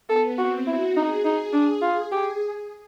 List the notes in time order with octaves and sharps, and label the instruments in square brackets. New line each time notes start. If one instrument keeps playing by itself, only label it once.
[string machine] B3 [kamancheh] A4
[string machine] C4 [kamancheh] F#4
[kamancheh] E4 [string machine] F#4
[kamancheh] D#4 [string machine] G#4
[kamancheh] D#4 [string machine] G#4
[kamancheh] D4
[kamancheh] F4 [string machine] G#4
[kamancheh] G4 [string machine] G#4